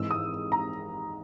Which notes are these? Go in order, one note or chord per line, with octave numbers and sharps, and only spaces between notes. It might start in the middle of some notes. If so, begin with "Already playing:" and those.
Already playing: G#1 G#2 E3 G#3 E6
D#6
A#5